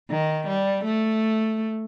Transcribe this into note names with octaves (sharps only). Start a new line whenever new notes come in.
D#3
G3
A3